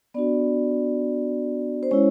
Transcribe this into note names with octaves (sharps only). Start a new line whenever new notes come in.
B3 D4 F#4 D5
C5
G#3 C#4 E4 C#5